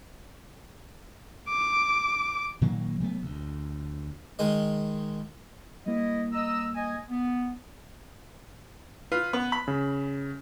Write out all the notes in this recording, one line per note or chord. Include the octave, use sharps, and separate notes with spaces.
D6
A#2 D#3 F#3 A#3
C3 F#3 A3 B3
D2
D#3 G#3 D#5
G3 A#3 E4 D#5
D#5 A#5 E6
D#5 G#5
B3
F4 B4
B3
B5
C#3